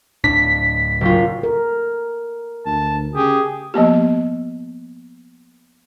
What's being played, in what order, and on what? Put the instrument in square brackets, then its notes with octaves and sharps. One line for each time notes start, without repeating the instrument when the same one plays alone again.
[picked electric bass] D1 A2 D4 [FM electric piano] B6
[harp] F#1 F4
[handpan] A4 A#4
[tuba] D2 [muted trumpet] A5
[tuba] C#3 [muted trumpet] G4 [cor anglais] G#4
[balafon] F3 A#3 B3 G4